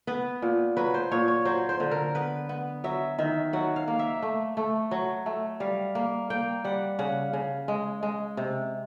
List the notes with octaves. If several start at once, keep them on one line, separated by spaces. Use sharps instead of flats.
B3 B4
A#2
F#3 B4
C5
A#2 C#5
C#5
F#3 C5
C5
D3
A#4
B3 B4
B3
F#3 E5
D#3 E5
F#3 F#5
F5
A#3
E5
A3
A3
F#3
A3
G3 F5
A#3
A#3 G5
G3 F#5
C#3 F#5
C#3
G#3
G#3
C3